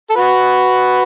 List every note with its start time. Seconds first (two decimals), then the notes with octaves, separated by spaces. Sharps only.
0.10 A4
0.16 F#4 B4